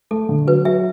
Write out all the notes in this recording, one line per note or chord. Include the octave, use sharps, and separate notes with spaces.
A3 A4
D3
F#3 B4
F#3 E5